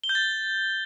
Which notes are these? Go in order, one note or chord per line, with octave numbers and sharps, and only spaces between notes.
G7
G6
A6